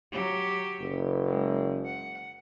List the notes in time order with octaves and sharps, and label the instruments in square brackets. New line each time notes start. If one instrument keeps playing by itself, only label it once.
[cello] F#3 G4
[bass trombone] F#1
[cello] G#3
F#5